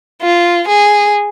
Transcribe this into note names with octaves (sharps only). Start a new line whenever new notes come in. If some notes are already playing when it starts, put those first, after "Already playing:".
F4
G#4